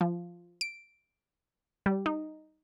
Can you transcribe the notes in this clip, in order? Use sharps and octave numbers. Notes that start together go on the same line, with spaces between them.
F3
D7
G3
D#4